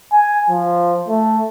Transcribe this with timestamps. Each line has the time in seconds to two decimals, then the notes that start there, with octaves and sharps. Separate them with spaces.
0.12 G#5
0.49 F3
1.08 A3